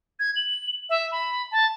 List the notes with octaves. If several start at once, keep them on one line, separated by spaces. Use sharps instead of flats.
G#6
F#7
E5
B5
A5